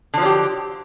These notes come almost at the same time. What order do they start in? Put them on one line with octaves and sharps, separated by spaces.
D3 F3 F#3 G4